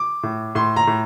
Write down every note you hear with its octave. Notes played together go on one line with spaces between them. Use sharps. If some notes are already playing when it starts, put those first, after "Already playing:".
Already playing: D6
A2
A2 C6
A#5
A2